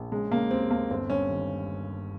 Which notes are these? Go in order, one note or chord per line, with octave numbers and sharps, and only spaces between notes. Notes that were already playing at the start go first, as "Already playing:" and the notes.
Already playing: A#1
C#3 G#3
C#3 A#3
D#2 C4
D#2 A#3
G1 C4
G2 C#4
D#3